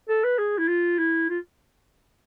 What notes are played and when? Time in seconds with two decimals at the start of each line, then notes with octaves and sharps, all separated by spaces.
0.09 A4
0.24 B4
0.39 G#4
0.58 E4
0.68 F4
0.99 E4
1.30 F4